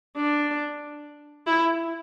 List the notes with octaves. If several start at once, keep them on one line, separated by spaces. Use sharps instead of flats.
D4
E4